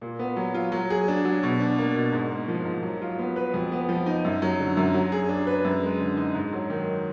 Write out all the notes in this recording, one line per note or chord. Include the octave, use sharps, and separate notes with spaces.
A#2
B3
F#3
F4
F#3
G#4
D4
F#3
B2
D4
A#3
B2
G#2
A#3
F3
G#2
F#3
F4
B3
B4
F2
B3
F3
D#4
F#2
F#3
D3
F#2
F#3
G#4
D4
B4
F#2
G#3
D3
D#4
G#2
F#3
D#3